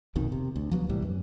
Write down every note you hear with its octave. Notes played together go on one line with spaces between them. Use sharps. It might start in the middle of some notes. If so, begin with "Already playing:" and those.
A#1 F2 B2 D#3
C3
D2
F3 F#3 A#3 B3
C2 A2 E3 G3
F#2